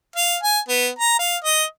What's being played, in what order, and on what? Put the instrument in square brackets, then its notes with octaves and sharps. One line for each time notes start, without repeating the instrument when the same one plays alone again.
[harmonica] F5
G#5
B3
A#5
F5
D#5